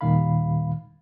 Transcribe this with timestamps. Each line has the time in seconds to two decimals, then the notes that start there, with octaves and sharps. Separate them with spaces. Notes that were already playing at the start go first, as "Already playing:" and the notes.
0.01 D#2 A#2 D#3 G3 F5 B5